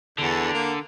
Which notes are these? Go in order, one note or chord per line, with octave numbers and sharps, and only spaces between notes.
E2 D3
A#3